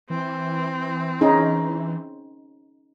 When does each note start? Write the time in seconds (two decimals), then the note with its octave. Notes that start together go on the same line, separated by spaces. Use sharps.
0.10 E3 C4
1.21 C#4 D#4 G#4